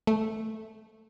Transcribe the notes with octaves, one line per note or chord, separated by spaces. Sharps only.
A3